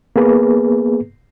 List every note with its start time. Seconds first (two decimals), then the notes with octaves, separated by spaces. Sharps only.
0.16 A#3 B3 G#4 B4